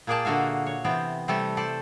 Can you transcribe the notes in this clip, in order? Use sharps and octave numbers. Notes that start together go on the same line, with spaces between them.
A#2 A#3 G#4 D5 G5 A5
D3 A#3 F#4 E5 F5
C#5
C3 E3 B3 C5 G5
C3 G3 A3 A4 A5
A4 C5 D5 A5